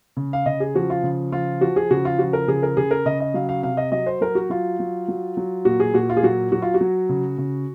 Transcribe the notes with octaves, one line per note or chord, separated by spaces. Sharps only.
C#3
F5
C#3 D#5
G#4
F3 F#4
F4
C#3
F3 F4
F3 F#4
G#4
C#3 F#4
F4
F3 F#4
A#4
C#3 G#4
A#4
C#3 G#4
A#4
C#3 D#5
D#5
F#3 F5
F5
C3 F5
D#5
F#3 D#5
C5
F#3 A#4
F#4
F#3 F4
F#3
F#3
F#3
A#2 F#4
G#4
A#2 F#4
F4
G#4
F#3 F#4
F#3 F#4
F4
F#4
F#3
C#3
C#3